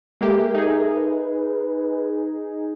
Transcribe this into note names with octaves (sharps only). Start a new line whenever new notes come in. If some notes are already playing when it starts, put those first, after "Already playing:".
G#3 A#3 G4 A4 A#4 E5
D#4 G#4
B4